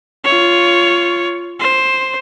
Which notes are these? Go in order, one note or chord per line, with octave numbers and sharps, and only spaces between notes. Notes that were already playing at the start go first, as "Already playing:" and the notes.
F4 C#5
C5